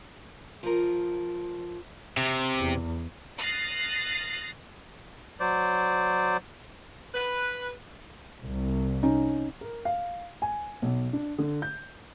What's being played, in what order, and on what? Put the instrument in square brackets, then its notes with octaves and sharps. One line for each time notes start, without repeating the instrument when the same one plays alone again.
[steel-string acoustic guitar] F3 A#4
[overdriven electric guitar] C3
[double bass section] E2
[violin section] D#6 F6 F#6 A6 A#6 C7
[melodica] F#3 C5 D5
[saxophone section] B4
[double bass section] C2
[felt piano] C#4 D#4
[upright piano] A#4
F5
G#5
B1
D4
D3
G6